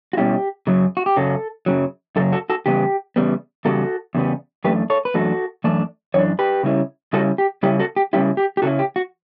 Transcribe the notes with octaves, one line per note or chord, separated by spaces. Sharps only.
F#4
B2 G3 C#4 E4 G4
F#2 C#3 F#3
F#4
G4
F#2 C#3 F#3 A4
F#2 C#3 F#3
F#2 C#3 F#3 A4
F#4 A4
F#4 A4
E2 C#3 G3 B3 G4
E2 C#3 G3 B3
E2 C#3 G3 F#4 A4
E2 C#3 G3 B3
F#2 E3 A3 D4 G4 B4
A4 C#5
B4
F#2 E3 A3 D4 F#4 A4
F#2 E3 A3 D4
F#2 E3 D4 C#5
G4 B4
C#3 G3 C#4 E4
C#3 G3 C#4 E4 F#4 A4
G4
C#3 G3 C#4 E4 G4
F#4 A4
G4
C#3 G3 C#4 E4 G4
G4
G4
C#3 F#3 C#4 E4 F#4 A4
G4
F#4